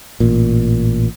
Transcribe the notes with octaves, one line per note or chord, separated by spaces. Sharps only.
A1 A#2